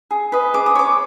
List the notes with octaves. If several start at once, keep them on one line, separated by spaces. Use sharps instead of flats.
G#4
B4 D#5
G#4 D6
D#6
C#5 D6